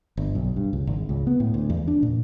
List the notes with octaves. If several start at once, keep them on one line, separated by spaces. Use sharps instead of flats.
G1
B1
G2
C#2
G#1
C#2
B3
A2
D2
E2
D4
A#2